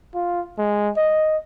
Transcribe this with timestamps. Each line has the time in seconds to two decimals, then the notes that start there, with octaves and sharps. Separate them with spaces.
0.15 F4
0.58 G#3
0.97 D#5